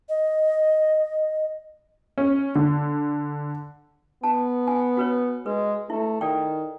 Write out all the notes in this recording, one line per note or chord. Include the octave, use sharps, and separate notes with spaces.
D#5
C#4
D3
B3 A5
G#5
F#4 B4 C#5
G#3 B4
A3 E4
D#3 A4 D5 G5